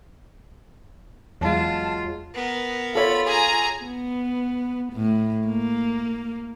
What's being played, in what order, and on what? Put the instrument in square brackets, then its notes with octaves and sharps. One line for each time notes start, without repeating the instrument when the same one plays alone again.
[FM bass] E2 [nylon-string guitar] F#3 G#3 [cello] F4 [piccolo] A5
[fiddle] B3 A#4
[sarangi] F4 [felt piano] A4 C#5 [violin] B5
[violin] G#4 A#5 [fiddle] G#5
[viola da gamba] B3
A2
A#3